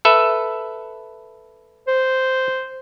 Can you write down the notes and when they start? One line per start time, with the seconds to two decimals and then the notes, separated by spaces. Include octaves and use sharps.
0.05 A4 B4 E5
1.87 C5